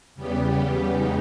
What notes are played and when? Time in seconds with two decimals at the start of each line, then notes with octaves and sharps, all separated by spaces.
0.15 E2 C#3 G3 B3 G4
0.88 E2 C#3 G#3 D#4